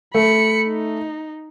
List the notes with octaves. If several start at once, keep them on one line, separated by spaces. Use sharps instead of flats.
A3 B5 C#7
D#4